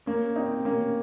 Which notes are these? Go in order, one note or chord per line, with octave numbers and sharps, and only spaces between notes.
A#3 C#4
C4 D#4
A#3 C#4